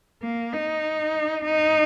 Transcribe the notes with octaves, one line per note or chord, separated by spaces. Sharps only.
A#3
D#4
D#4